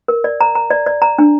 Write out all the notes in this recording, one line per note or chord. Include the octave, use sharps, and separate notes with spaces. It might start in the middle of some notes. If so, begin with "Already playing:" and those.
A#4
D5
A#5
A#5
D5
D5
A#5
D4